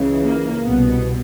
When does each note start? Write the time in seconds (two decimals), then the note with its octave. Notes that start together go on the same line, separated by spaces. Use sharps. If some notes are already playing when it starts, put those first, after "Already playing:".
Already playing: C#2 C#3 E3
0.24 A#3
0.66 C2 B2 B3